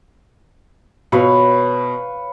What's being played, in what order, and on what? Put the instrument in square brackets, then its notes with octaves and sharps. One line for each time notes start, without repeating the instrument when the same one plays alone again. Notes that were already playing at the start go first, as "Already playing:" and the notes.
[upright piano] B2 [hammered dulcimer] B4 C#5 F5